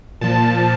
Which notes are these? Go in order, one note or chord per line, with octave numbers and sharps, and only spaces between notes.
A#2 F3 A5